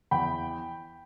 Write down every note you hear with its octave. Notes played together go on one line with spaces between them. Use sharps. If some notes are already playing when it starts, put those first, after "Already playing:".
E2 G5 B5